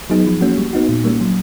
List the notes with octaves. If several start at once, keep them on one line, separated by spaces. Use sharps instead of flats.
F#3 B3 D#4 G#4
F3
A#3 C#4 F#4
G3
B3 D#4 F#4
A#2
G3 A#3 C#4
F#3